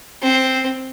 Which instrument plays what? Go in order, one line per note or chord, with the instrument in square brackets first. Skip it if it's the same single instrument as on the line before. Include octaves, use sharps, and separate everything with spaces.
[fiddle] C4